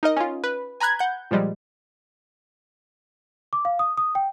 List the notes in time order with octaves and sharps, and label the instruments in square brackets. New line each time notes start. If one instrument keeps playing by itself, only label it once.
[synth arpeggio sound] D#4 A#4 D#5
C#4 F4
B4
G#5 A#5 B5 F#6 G#6
F#5 G6
A#2 F3 G3 G#3
[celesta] D6
F5
D#6
D#6
G5